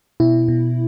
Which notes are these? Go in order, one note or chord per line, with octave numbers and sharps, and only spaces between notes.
B2 E4
B2